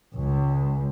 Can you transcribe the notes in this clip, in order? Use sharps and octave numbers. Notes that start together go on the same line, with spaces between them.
C#2